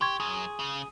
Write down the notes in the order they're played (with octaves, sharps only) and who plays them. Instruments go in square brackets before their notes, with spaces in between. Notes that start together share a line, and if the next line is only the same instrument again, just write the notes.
[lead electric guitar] G4 [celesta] C6 C#6 G#6
[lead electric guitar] F#2 [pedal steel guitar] G#4
[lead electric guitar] C#3